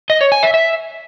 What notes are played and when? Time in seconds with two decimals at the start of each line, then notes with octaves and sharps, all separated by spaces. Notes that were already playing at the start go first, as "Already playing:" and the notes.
0.10 D#5
0.21 C#5
0.32 G#5
0.43 E5
0.54 E5